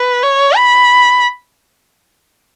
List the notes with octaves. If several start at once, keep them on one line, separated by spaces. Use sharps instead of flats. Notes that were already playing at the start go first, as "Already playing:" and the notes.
Already playing: B4
C#5
B5